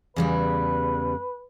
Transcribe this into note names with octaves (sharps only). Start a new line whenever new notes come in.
E2 C#3 G3 B4